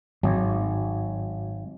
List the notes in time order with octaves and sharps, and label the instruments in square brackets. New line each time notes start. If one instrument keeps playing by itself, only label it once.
[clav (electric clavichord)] G#1 [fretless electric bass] G#2 [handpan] F#3